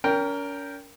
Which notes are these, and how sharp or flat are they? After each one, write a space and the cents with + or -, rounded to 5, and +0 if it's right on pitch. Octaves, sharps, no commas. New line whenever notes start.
C#4 +40 A#4 +0 G5 +0